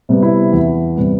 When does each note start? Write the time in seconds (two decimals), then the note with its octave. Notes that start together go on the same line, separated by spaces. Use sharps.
0.09 C3 G3 B3
0.22 E4
0.52 E2
0.96 C3 G3 B3